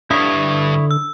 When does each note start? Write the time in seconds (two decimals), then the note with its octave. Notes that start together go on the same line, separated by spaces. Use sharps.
0.11 G2 D3 E4 C#5 D#6
0.91 E6